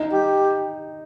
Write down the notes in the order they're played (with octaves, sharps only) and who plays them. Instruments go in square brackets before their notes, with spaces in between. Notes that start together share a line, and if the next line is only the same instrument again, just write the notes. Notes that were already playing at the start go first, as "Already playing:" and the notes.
Already playing: [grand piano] D#4
[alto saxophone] G4